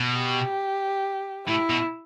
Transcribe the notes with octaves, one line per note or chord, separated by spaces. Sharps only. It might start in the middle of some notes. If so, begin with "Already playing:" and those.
Already playing: B2
G4
A2 E4
B2